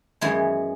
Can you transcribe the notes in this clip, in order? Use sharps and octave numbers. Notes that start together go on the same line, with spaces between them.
F#2 E3 G#3 B3